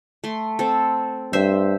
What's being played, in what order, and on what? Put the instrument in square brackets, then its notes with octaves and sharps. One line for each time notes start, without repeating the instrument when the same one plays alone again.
[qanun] A3 C6
C4 A4
[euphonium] G2 [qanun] C5 E5